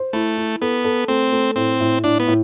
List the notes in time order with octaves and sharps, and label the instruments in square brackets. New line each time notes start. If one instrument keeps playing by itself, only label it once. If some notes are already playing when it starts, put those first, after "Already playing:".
Already playing: [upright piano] C5
[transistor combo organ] A3 [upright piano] E4
[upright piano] E4
[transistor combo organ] B3 [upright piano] A4
[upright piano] A4
[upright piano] A3 [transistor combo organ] C4
[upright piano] A3
[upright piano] A2 [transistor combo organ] C4
[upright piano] A2
[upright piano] A2 [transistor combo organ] D4
[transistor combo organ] B3
[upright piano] A2